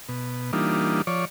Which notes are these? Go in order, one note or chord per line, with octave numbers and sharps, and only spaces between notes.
B2
E3 G3 A#3 D4 D#4 F4
F3 C#5 D5